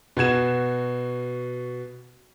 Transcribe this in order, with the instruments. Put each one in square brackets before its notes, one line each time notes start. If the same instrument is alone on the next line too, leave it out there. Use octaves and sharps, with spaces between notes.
[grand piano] B2 F#4 G#6 E7